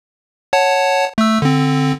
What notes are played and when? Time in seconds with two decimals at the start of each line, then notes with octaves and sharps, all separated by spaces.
0.53 C#5 F#5 A5
1.18 A3 E6
1.42 D3 C4